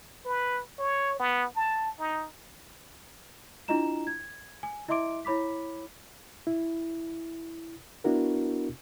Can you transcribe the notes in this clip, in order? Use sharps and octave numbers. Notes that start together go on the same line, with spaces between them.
B4
C#5
B3
A5
D#4
D4 E4 F4 D#5 A#5 E7
G#6
G#5
E4 D#5 E5 C6 D6 D7
E4 C#5 B5 D6 B6
E4
B3 D4 E4 F#4 A#4